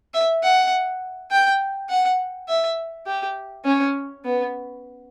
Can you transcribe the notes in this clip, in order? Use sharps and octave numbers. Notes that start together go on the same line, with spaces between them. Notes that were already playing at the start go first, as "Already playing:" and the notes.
E5
F#5
G5
F#5
E5
G4
C#4
B3